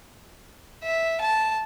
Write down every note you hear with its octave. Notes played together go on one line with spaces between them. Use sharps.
E5
A5